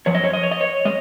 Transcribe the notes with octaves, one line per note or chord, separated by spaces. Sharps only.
F#2 F3 C#5
D#5
C#5
D#5
C#5
D#5
C#5
G#3 D#5